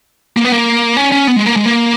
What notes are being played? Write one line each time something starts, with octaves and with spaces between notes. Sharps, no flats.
A#3
B3
A#3
C#4
C#4
B3
G#3
A#3
G#3
A#3